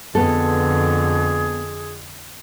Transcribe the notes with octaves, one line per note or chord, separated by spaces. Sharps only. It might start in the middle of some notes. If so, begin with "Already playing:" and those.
F2 D3 B3 G#4 A4